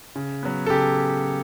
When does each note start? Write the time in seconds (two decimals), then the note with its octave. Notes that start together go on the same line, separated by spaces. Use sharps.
0.15 C#3
0.43 F#3 B3
0.66 A4
0.70 C#3 G4